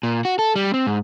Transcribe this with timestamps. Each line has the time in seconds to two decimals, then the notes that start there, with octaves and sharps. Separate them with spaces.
0.03 A#2
0.25 F#4
0.39 A4
0.56 G3
0.74 C4
0.87 G#2